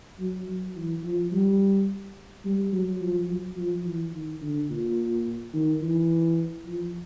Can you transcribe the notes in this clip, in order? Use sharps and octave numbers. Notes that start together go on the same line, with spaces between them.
F#3
F#3
E3
F3
G3
G3
F#3
F3
F#3
F3
E3
D#3
D3
A#2
D#3
E3
F3